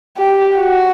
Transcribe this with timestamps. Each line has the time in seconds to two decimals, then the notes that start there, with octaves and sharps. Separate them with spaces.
0.17 G4
0.57 F#4